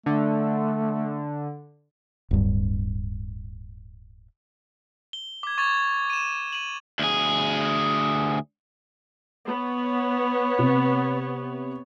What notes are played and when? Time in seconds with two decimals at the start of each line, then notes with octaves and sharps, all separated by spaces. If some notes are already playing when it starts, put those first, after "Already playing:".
0.06 D3 A3
2.31 D1 G2
5.13 G7
5.43 D6 G#6
5.58 C#6 G#6 A6 F7
6.10 D#7 E7
6.53 D#7 F#7
6.99 D2 G#4
9.48 B3 C#5
10.59 C3